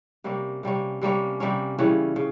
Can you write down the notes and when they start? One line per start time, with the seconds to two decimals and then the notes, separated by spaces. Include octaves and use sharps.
0.24 C3 G3 A#3 C#4
0.63 C3 G3 A#3 C#4
1.01 C3 G3 A#3 C#4
1.40 C3 G3 A#3 C#4
1.78 C#3 E3 G3 C#4
2.16 C#3